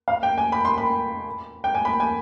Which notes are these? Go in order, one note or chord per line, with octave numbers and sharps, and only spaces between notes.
F5
G5
G#5
B5
C6
B5
G5
G#5
B5
G#5